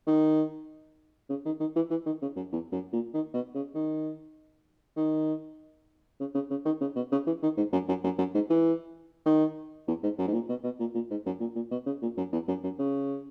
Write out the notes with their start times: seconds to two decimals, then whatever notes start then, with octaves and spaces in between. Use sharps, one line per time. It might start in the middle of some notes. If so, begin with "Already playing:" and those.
0.07 D#3
1.30 C#3
1.45 D#3
1.60 D#3
1.76 E3
1.90 E3
2.06 D#3
2.22 C#3
2.36 F#2
2.52 E2
2.72 F#2
2.93 A#2
3.14 D#3
3.34 B2
3.55 C#3
3.75 D#3
4.97 D#3
6.20 C#3
6.35 C#3
6.51 C#3
6.66 D#3
6.81 C#3
6.96 B2
7.12 C#3
7.27 E3
7.43 D#3
7.57 G#2
7.73 F#2
7.88 F#2
8.04 F#2
8.18 F#2
8.34 G#2
8.50 E3
9.26 D#3
9.88 E2
10.03 G#2
10.18 F#2
10.27 G#2
10.33 A#2
10.49 B2
10.64 B2
10.80 A#2
10.95 A#2
11.10 G#2
11.26 F#2
11.40 A#2
11.56 A#2
11.71 B2
11.86 C#3
12.02 A#2
12.17 F#2
12.33 E2
12.48 F#2
12.63 F#2
12.79 C#3